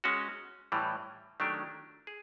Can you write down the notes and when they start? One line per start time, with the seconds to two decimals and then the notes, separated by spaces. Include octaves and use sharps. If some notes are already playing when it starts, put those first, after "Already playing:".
0.04 G#3 C#4 F#4
0.72 A2 E3 G3
1.40 D#3 F#3 A3 D4 G4
2.07 G#4